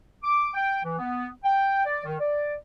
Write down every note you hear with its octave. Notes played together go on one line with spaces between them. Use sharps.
D6
G5
E3
B3
G5
D5
D#3
D5